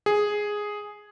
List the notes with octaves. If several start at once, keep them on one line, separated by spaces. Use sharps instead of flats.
G#4